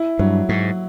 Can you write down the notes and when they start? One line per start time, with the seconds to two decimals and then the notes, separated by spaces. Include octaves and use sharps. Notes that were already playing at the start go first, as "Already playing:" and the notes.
Already playing: E4
0.19 G2 F#3
0.49 G#2 F#3